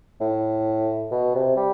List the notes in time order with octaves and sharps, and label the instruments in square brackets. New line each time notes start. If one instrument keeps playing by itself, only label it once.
[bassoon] A2
B2
C3
G3